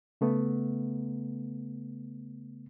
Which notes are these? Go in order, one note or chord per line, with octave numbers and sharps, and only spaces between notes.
C#3 A3 B3